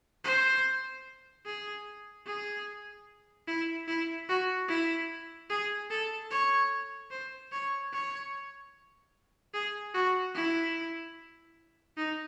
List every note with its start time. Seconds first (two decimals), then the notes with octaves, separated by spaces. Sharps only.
0.24 C5
1.46 G#4
2.27 G#4
3.48 E4
3.88 E4
4.29 F#4
4.69 E4
5.50 G#4
5.90 A4
6.31 C#5
7.11 C5
7.52 C#5
7.93 C#5
9.54 G#4
9.94 F#4
10.35 E4
11.97 D#4